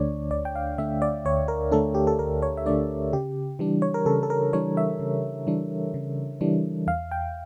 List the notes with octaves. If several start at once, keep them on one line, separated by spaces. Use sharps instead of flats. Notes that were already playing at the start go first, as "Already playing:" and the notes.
Already playing: D2 D3 A3 D4 C#5 D5
D2 D5
G5
F5
D3 A3 D4 E5
D5
D2 C#5
A#4
D3 A3 D4 A4
G4
A4
D2 A#4
C#5
E5
D3 A3 D4 D5
C#3 G4
E3 G3 D4
C#5
A#4
C#3 A4
A4
A#4
E3 G3 D4 C#5
E5
C#3
E3 G3 D4
C#3
E3 G3 D4
E2 F5
G5